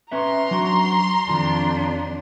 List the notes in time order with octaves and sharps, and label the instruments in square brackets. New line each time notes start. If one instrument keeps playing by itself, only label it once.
[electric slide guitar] C#4 B4 E5 [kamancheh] A#5 C6
[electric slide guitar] F#3 D4 F#4
[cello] F2 D4 [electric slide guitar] D#3 F4 A5